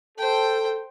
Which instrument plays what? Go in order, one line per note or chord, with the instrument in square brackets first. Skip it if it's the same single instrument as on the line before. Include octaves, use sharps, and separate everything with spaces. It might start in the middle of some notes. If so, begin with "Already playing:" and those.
[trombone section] A4 [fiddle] C5 G5